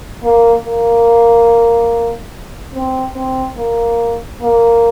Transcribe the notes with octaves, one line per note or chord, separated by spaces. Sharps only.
A#3
A#3
C4
C4
A#3
A#3